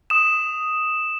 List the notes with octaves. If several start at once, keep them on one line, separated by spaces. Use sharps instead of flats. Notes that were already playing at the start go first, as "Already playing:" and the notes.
D#6 E7